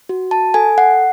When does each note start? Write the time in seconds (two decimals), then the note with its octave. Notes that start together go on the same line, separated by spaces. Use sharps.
0.09 F#4
0.31 A5
0.54 A4 G#5
0.78 F#5